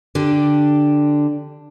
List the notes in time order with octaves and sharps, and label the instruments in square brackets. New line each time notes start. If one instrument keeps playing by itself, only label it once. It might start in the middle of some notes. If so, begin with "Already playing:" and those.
[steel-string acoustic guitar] D3 D4 G4